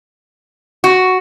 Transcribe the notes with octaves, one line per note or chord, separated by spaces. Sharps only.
F#4